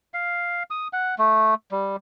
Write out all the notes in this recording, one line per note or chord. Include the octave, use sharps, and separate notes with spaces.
F5
D#6
F#5
A3
G3